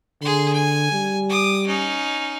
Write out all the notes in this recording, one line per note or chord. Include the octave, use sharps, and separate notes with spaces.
D3 G#4 C6
G#5
G3
D6 D#6
C#4 D#4